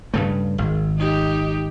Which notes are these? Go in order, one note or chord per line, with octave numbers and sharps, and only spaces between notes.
G2 C#3 A3
G#1
D#4 G4